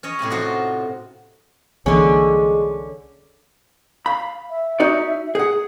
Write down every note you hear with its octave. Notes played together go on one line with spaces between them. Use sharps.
C#4 C#5 D#5
A2 C3 G#5 B5
D#4 F4 F#4 C5
C2 D3 E3 G#3 A#3 C#4
F5 B5
E5
D#4 F#4 D5
G#4 F#5